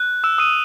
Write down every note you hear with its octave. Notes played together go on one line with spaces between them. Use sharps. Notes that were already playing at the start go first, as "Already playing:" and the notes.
Already playing: F#6
E6 E7
D#6 D#7